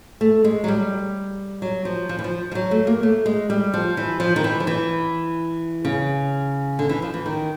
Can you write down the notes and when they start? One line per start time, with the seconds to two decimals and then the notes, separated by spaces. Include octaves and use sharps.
0.21 A3
0.44 G#3
0.64 F#3
0.68 G3
1.62 F#3
1.85 F3
2.09 F3
2.19 E3
2.24 F3
2.52 F3
2.55 F#3
2.71 A3
2.87 A#3
3.03 A3
3.26 G#3
3.50 G3
3.74 F3
3.97 E3
4.20 F3
4.36 D#3
4.44 E3
4.60 F3
4.67 E3
5.85 C#3
6.79 D3
6.89 E3
7.02 F3
7.14 E3
7.26 D#3